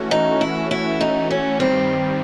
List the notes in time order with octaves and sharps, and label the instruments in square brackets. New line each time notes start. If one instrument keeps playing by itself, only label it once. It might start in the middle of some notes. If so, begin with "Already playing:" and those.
Already playing: [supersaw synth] E3 A3 C#4 F#4
[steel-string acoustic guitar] D#4
E4
E4
D#4
C#4
[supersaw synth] G2 D#3 G3 [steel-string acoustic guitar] C4